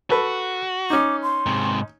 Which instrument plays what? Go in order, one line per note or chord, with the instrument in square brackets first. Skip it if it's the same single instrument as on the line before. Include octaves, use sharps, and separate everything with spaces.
[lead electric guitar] F#4 [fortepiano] A4 B4
[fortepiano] C#4 D#4 [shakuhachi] D6
[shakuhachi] C6
[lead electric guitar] G#2 C3